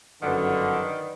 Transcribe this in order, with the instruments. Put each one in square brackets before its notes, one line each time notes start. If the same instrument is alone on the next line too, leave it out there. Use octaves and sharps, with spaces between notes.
[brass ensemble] G1 F#2 D3 [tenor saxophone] D#3 [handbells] B4 D5 F#5